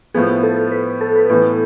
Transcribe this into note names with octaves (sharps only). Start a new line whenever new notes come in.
A2 F3 B3 G#4
A4
B4
A4
B4
A2 E3 B3